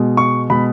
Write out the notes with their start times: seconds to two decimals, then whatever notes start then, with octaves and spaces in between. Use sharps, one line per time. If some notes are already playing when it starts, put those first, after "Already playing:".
Already playing: B2 G#3
0.17 C#6
0.50 B2 G#3 B5